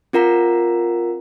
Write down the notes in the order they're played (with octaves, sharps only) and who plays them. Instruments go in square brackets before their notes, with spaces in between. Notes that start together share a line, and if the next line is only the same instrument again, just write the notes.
[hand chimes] C4 F4 A#4 F#5 A#5 B6